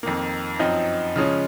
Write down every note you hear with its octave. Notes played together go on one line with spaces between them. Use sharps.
F2 D#3 A#3
F#2 F3 C4 D#4
C#3 F3 G#3 C#4